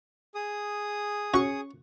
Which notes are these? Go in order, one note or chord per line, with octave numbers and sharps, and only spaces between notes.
G#4 D#6
C#4 F#4 C#6